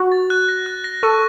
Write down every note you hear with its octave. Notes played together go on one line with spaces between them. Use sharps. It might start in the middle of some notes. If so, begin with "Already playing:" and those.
Already playing: F#4
A6
F#6
A#6
F#6
A#6
A4 C#6